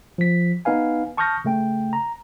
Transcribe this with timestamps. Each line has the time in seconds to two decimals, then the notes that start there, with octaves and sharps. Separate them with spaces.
0.18 F3 B6
0.65 B3 D#4 B4 F5 G#5
1.17 A5 C#6 D#6 F6 G6 A#6
1.45 C#3 A3 G5
1.93 A#5